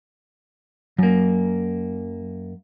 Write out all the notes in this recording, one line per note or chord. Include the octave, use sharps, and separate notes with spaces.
F#2 F#3 A#3